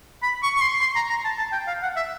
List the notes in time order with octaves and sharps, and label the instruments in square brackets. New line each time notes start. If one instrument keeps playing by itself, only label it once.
[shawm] B5
C#6
C#6
C6
C6
A#5
A#5
A5
A5
G5
F5
F#5
E5